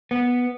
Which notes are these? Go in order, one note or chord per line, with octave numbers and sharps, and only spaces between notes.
B3